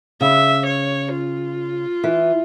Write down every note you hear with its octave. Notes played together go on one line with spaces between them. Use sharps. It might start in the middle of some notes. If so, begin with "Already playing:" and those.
C#3 E5
C#5
F4
E3